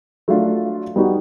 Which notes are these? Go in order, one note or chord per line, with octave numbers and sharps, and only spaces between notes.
F#3 A3 D4 F4
G3 B3 D#4 F#4